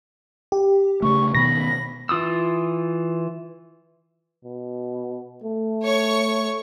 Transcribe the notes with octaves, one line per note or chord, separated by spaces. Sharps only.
G4
C#3 A3 C#6
B2 D#3 B3 B5 A#6
E3 F4 D#6 E6
B2
A3
C#5 C#6